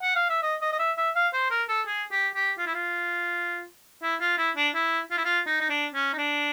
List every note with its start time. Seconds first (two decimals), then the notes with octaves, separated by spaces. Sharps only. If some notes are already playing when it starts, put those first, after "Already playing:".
0.03 F#5
0.16 F5
0.30 E5
0.43 D#5
0.62 D#5
0.72 D#5
0.79 E5
0.98 E5
1.15 F5
1.33 C5
1.51 A#4
1.69 A4
1.87 G#4
2.11 G4
2.35 G4
2.58 F4
2.66 E4
2.74 F4
4.03 E4
4.20 F4
4.38 E4
4.56 D4
4.75 E4
5.11 F4
5.18 E4
5.25 F4
5.47 D#4
5.61 D#4
5.70 D4
5.94 C#4
6.13 D#4
6.18 D4